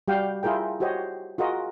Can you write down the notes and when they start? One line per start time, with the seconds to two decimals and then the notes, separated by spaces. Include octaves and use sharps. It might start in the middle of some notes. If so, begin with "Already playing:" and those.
0.08 G3 F#4 G4 F5 G5
0.43 E4 F4 G#4 A#4 G5
0.80 F#4 G4 C5 C#5 D#5
1.38 F4 F#4 G#4 A#4 D#5